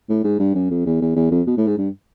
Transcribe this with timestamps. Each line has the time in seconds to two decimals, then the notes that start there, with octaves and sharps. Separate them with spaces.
0.09 A2
0.24 G#2
0.39 G2
0.55 F#2
0.70 F2
0.86 E2
1.01 E2
1.16 E2
1.31 F2
1.47 B2
1.57 A2
1.67 G#2
1.78 G2